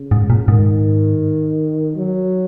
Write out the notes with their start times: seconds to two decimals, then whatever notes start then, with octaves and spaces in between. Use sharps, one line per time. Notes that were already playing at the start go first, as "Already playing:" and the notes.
Already playing: C#3
0.11 G#2
0.30 A#2
0.48 G#2 D#3
1.96 F#3